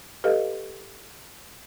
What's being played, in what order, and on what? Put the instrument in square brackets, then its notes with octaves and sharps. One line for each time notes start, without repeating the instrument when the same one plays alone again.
[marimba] G4 A4 B4 D#5 F5